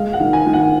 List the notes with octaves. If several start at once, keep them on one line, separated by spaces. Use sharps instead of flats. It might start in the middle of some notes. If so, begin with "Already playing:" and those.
Already playing: G#3 F5
F#5
D#3
G#5
D#3
F#5